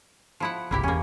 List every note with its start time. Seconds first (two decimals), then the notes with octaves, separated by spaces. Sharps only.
0.40 F3 E4 F#5
0.71 G1 C2 A#3 E4 G4
0.83 E2 A#3 C#4